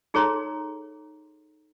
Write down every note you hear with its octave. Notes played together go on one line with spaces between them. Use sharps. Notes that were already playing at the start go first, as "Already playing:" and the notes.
D#4 G#4 A4 C#5 A#5 C6